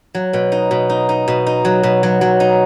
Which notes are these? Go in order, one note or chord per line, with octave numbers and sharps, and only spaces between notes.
F#3
B2
D#4
B2
D#4
D#4
B2
D#4
F#3
B2
F#3
F#3
D#4